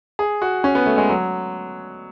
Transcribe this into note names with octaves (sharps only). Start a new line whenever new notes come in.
G#4
F#4
C#4
B3
A3
G#3
F#3